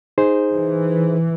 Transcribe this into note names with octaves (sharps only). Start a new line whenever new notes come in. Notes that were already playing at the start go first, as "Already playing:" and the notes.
D#4 G#4 C5
E3